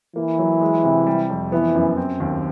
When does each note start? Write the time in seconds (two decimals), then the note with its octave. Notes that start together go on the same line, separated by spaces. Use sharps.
0.16 E3 A#3
0.39 F#3
0.61 G#3
0.84 C3
1.07 G3
1.30 F2
1.52 E3 B3
1.75 F#2
1.97 C4
2.20 D#2